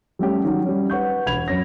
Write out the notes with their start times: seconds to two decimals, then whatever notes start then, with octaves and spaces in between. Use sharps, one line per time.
0.19 G3 A3 C#4 G4
0.44 D#3 F#3
0.66 G3 C#4
0.90 B4 F#5 C#6 G6
1.26 E1 B5 G#6 F7
1.48 F#2 C#4 A#6